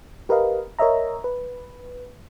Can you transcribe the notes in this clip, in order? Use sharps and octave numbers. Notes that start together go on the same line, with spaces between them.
G4 A#4 B4 D#5 F5
A#4 C#5 D#5 E5 A#5
B4